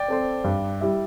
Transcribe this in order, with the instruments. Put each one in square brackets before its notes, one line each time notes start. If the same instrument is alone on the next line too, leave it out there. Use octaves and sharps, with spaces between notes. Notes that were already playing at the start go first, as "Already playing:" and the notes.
Already playing: [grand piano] D5 G5
[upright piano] C4 A4 C5
G2
G3 E4 G4 E5